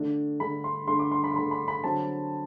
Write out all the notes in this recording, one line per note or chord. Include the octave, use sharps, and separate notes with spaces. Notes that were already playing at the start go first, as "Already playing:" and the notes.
Already playing: D3 A3 D4
D3 A3 D4 B5
C6
D3 A3 D4 C6
D6
C6
B5
C6
D3 A3 D4 B5
B5
B5
D3 F#3 C4 A5